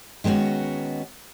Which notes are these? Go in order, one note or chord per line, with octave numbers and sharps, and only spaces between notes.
D#3 G#3 B3 C#4 F#4